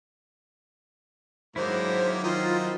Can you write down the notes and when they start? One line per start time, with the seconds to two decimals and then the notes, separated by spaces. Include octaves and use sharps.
1.56 G#2 D3 D#3 F#3 A#3 E4 C5
2.24 D#3 C4 D#4 F4